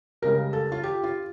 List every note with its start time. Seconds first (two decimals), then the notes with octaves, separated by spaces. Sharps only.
0.22 C#2 C#3 G3 A#4
0.53 A4
0.72 F4
0.83 G4
1.04 F4